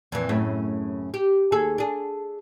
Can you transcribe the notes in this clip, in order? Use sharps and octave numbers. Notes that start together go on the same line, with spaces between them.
F2 A#2 E3
F#2 A2 C#3
G4
D#2 G#4 A4
D4 G#4